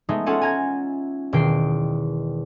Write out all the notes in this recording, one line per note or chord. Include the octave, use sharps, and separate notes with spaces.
G#3 A3 B3 D#4
C#4 F4 A4 F#5 G#5
G#5 A#5 G#6
E1 D#3 G5 C7